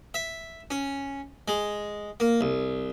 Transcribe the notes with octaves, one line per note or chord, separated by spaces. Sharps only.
E5
C#4
G#3
A#3
C2